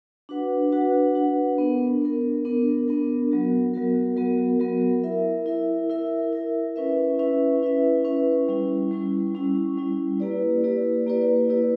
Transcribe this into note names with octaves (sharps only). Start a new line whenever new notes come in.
D4 F#4 B4 F#5
D4 F#4 B4 F#5
D4 F#4 B4 F#5
B3 D4 A#4
B3 D4 A#4
B3 D4 A#4
B3 D4 A#4
F#3 B3 F#4 A#4
F#3 B3 F#4 A#4
F#3 B3 F#4 A#4
F#3 B3 F#4 A#4
E4 A#4 E5
E4 A#4 E5
E4 A#4 E5
E4 A#4 E5
C#4 E4 B4 E5
C#4 E4 B4 E5
C#4 E4 B4 E5
C#4 E4 B4 E5
G3 C#4 E4
G3 C#4 E4
G3 C#4 E4
G3 C#4 E4
A#3 E4 G4 B4 D5
A#3 E4 G4 B4 D5
A#3 E4 G4 B4 D5
A#3 E4 G4 B4 D5